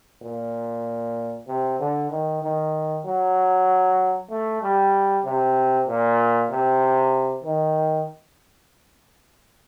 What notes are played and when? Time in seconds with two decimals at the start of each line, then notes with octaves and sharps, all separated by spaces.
0.22 A#2
1.48 C3
1.79 D3
2.11 D#3
2.42 D#3
3.05 F#3
4.30 A3
4.62 G3
5.25 C3
5.88 A#2
6.50 C3
7.44 D#3